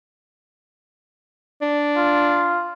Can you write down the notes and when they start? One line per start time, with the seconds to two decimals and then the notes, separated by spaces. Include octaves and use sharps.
1.61 D4
1.97 F4